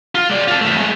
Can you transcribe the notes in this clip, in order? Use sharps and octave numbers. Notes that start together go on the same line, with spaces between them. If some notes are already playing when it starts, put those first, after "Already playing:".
F4
G#3 D5
F4 A4
E2 A3
G#3 A3